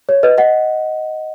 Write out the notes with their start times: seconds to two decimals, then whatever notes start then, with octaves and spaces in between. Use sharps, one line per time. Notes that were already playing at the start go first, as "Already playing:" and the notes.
0.09 C#5
0.23 B4 D#5
0.38 D#5 F#5